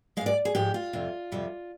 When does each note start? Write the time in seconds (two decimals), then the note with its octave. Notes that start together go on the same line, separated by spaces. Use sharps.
0.17 F3 G#3 F5
0.21 G#2
0.26 D5
0.45 G#4
0.55 G#2 F3 G#3 G4
0.74 F4
0.93 F2 C3 G3
1.32 F2 C3 G3